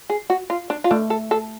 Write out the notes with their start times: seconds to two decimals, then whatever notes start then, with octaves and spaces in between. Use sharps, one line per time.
0.10 G#4
0.30 F#4
0.50 F4
0.70 D4
0.84 F4
0.91 A3 D4
1.10 A4
1.31 A4